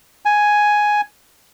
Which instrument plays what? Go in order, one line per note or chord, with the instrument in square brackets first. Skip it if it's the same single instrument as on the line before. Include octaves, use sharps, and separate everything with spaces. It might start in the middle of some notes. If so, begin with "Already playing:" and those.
[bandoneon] G#5